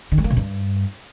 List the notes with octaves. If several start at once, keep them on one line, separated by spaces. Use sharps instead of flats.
D#3
G3
A#3
B2
G2